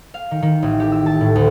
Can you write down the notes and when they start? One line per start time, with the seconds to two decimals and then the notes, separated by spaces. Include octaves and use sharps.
0.14 F5
0.31 D#3
0.42 D#3
0.62 A1
0.80 G4
0.92 E6
1.06 A5
1.21 A2
1.36 D2